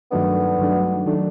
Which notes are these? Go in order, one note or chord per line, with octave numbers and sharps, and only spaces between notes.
G2 D#3 F#3 A3 B3 D4
G2 D#3 F#3 A3 D4
D#3 F#3 A3 D4